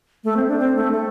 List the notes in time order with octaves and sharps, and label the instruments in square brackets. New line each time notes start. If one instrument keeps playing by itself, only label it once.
[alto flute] A3
C4
D4
C4
A3
A3